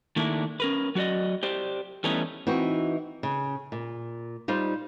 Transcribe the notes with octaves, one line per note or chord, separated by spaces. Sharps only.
D#3 A3 A#3 D4 E4
C#4 A#4 B4
F#3 F#4 G4 D5 D#5
G4 C5 D5
E3 G3 A3 B3 C#4 D#4
E3 C4 D#4 F#4
C#3
A#2
G3 D#4 F4 C5